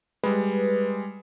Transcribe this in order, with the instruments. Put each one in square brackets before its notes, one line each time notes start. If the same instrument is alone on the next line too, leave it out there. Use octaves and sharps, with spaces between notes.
[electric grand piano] G3 G#3 [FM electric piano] B4